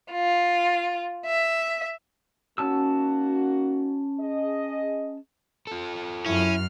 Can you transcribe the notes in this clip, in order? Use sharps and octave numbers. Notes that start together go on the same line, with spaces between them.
F4
E5
A#3 C#4 D#4 F#4 A5 E6
G#4 D#5
F4 A4
F#2 C#4 E4 F6